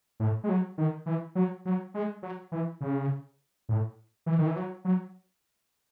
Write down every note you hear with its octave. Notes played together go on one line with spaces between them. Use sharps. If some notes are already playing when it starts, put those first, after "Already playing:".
A2
G#3
F#3
D#3
E3
F#3
F#3
G#3
F#3
E3
C#3
A2
E3
D#3
E3
F#3
F#3